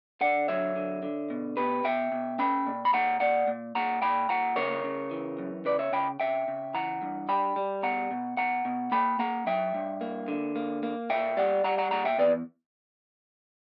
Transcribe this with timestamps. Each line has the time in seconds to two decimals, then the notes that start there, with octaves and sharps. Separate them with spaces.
0.21 D3 D5 F#5
0.48 F#3 C#5 E5
0.76 D3
1.03 D3
1.30 B2
1.57 B2 G4 B4
1.84 B2 E5 G5
2.12 B2
2.39 C#4 G5 B5
2.66 A#2
2.85 B5
2.93 A#2 F#5 A#5
3.20 A#2 D5 F#5
3.47 A#2
3.75 A#2 F#5 A#5
4.02 A#2 G5 B5
4.29 A#2 F#5 A#5
4.56 C#3 A#4 C#5
4.84 C#3
5.11 E3
5.39 F#2
5.65 C#3 B4 D5
5.79 C#5 E5
5.92 C#3 G5 B5
6.20 C#3 E5 G5
6.48 C#3
6.74 E3 F#5 A#5
7.02 G2
7.29 G3 G5 B5
7.56 G3
7.83 B2 F#5 A#5
8.11 B2
8.37 B2 F#5 A#5
8.65 B2
8.92 A#3 G5 B5
9.19 A#3 F#5 A#5
9.46 F#3 E5 G5
9.75 G2
10.01 A#3
10.28 D3
10.56 A#3
10.83 A#3
11.10 A#2 E5 G5
11.37 G3 D5 F#5
11.64 G3 F#5 A#5
11.78 F#5 A#5
11.91 A#2 F#5 A#5
12.05 E5 G5
12.18 E2 B4 D5